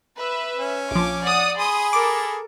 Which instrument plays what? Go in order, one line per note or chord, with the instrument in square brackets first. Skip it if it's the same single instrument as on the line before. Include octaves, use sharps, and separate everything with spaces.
[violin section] B4 E5
[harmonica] C#4
[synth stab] A#1 F3 [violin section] D6
[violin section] D5 F#5 D#6
[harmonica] G#4 B5 [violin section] C6 D#6
[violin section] A4 A#4 [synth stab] D6